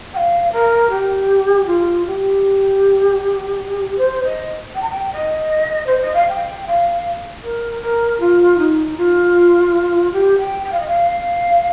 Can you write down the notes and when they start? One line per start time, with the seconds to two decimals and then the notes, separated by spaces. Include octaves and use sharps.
0.13 G5
0.16 F5
0.51 A#4
0.90 G4
1.66 F4
2.05 G4
3.97 C5
4.23 D#5
4.74 G5
4.81 A#5
4.90 G5
5.12 D#5
5.86 C5
6.00 D#5
6.14 F5
6.28 G5
6.66 F5
7.43 A#4
7.81 A#4
8.20 F4
8.58 D#4
8.97 F4
10.12 G4
10.38 G5
10.64 G5
10.71 F5
10.79 D#5
10.87 F5